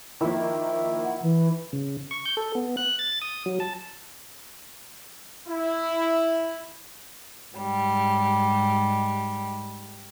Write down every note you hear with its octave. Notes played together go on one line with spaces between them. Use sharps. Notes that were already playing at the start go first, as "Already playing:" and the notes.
D#3 F3 A#3 E4
F#5
E3
C#3
C#6
G6
A4
B3
F#6
A6
D#6
F#3
A5
E4
G#2 G3